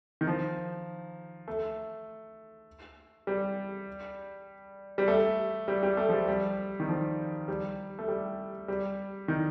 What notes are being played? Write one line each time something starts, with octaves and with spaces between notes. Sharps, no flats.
D#3
F3
A3
G3
G3
A3
G3
G3
A3
F3
G3
G3
D#3
F3
G3
A3
G3
G3
D#3